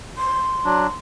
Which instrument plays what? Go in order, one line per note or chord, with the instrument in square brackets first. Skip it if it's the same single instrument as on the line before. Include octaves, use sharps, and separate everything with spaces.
[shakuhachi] C6
[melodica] F#3 D4